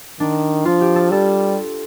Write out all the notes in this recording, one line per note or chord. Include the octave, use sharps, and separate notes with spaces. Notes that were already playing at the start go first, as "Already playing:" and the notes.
D#3 D4
F3 F4
G4
A4
G3 A4